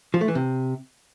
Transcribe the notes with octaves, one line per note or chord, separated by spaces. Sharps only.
F3
A3
E3
C3